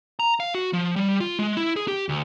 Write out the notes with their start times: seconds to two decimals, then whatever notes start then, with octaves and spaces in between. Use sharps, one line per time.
0.19 A#5
0.40 F5
0.55 F#4
0.73 F3
0.96 G3
1.20 F4
1.39 G#3
1.57 E4
1.76 G#4
1.88 G4
2.09 D2